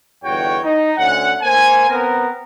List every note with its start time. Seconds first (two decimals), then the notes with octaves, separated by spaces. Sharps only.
0.23 G1 E2 F#4 C#5 G5
0.64 D#4
0.97 D2 C#4 F#5
1.42 A#3 C5 G#5
1.89 B3 C4 A#4